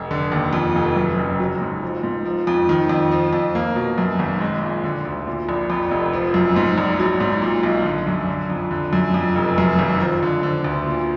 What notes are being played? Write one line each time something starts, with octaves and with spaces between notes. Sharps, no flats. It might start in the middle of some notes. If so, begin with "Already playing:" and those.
Already playing: F1
D3
D#2
F2
F1
F#2
F#1
F#3
G#2
F3
G#2
F3
F2
D#3
F2
F3
F2
A#3
B2
F#2
G#1
G#3
A#2
D3
D2
A#2
A#1
F2
F1
F3
F#2
G#2
A#1
F#3
G#2
A#2
B1
D3
F#2
D3
F2
D3
F#2
F2
F1
F#2
G#1
F3
D3
D3
D2
A#2